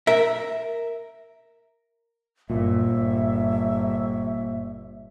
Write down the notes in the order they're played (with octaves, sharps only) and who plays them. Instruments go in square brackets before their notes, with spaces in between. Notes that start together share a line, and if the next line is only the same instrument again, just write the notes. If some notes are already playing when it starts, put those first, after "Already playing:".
[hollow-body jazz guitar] A#4 E5
[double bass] G1 [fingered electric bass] A#2 [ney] E5